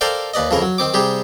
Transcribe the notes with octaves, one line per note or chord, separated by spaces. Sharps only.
A4 A#4 C5 D5 F5 G5
D#2 B4 D5 D#5
F2 C#3 E3 A#4
F#3
D#3 C4 D6
C3 G3 G4 G#4